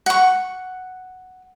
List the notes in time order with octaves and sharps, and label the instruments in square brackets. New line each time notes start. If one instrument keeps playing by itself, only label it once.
[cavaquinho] F#5 C#6